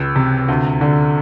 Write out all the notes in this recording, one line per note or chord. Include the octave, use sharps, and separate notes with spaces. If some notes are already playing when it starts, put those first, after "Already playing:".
Already playing: C#2 E6
C3
D2
D3